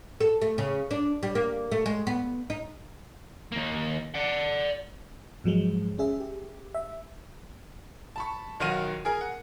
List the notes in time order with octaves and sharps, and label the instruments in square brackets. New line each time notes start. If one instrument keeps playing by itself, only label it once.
[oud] A4
A3
C#3
D4
G3
A#3
A3
G#3
B3
D#4
[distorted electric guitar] D#2 A#3
D5 F#5
[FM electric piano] G#2 F3 F#3 G#3
C#4 G#4 E5
G4
E5
[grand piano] A5 B5 C#6
B1 D#3 F4 F#4 F#5 D#7
G#4 A#4 G#5
F#5